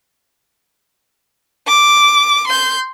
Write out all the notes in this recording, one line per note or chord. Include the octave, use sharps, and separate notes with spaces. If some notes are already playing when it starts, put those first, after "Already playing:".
D6
C6 G6